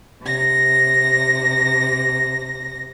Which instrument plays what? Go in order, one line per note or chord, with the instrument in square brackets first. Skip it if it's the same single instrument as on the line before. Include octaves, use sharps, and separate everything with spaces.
[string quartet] C3 A#6